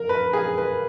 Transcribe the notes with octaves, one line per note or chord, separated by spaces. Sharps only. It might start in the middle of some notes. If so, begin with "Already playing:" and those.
Already playing: A#4
B4
G#4
B4